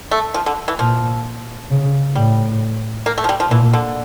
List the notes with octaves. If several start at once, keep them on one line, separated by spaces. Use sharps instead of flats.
A3
F3
D3
E3
A#2 F3
C#3
A2 G3
A#3
A3
F3
G3
F3
A#2 E3
D3